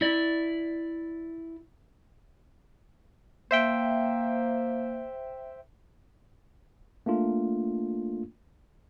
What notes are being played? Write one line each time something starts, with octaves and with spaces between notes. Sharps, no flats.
E4 D5
A#3 C5 E5 G5
A3 A#3 D4 F4